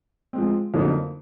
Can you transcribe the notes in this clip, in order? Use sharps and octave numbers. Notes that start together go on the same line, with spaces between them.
F3 G#3 C4
F2 D3 F#3 A#3 D#4